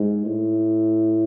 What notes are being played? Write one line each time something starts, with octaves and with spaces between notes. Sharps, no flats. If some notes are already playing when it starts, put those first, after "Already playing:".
Already playing: G#2
A2